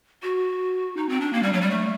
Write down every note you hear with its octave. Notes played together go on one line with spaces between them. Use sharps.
F#4
D#4
C4
D4
A#3
G3
F#3
G3
A3